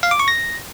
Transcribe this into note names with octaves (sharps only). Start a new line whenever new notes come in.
F5
D6
C#6
A#6